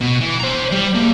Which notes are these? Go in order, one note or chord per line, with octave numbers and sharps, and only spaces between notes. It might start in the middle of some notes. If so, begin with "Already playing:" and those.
B2
E3
C5 A#5
G3
A#3 G#4